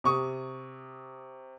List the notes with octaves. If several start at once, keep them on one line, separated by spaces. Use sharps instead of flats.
C3 C#6 D#6